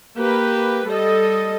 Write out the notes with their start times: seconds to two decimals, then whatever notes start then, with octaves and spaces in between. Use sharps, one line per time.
0.18 A#3 G4 B4
0.88 G3 A4 D#5